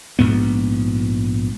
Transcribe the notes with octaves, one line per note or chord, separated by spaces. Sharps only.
A#1 G#2 B3